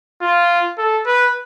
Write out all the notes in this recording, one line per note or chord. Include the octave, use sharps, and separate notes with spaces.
F4
A4
B4